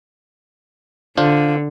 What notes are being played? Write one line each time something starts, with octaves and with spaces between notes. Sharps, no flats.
D3 D4 F4 C5